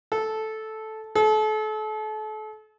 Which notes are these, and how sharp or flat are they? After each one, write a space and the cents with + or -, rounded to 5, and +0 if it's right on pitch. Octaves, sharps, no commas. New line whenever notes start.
A4 -10
A4 -35